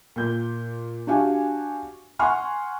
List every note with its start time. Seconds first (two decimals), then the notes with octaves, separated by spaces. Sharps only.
0.16 A#2 G6
1.07 D4 F#4 G4 F5 G#5
2.19 F#5 G#5 C6 C#6 F6